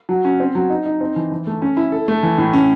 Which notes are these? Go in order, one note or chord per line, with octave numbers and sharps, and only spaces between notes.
F#3
C#4
C4
F#3
D#4
D#4
C4
E3
E3
A3
C#4
E4
A4
A3
E3
A2
C#4